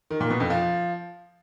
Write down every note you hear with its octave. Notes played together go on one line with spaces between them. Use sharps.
D#3
A#2
B2
F2
F3